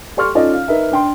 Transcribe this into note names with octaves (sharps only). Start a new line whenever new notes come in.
G4 A4 D5 C6 C#6 F6
C#4 D#4 F4 A4 D5 D#5
F5
D#4 A#4 B4 E5
D4 G5 C6